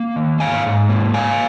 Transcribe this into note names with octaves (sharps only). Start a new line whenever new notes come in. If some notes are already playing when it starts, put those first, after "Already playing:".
Already playing: A#3
D#3
G#2 F5 G#5
G#2
A#3
A#3 F5 G#5